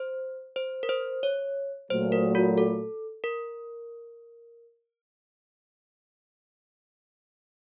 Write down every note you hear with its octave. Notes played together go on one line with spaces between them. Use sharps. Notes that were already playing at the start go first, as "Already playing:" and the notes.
Already playing: C5
C5
A#4
C5
C#5
A#2 F#3 A3 C5
A#4
F#4
A4
A#4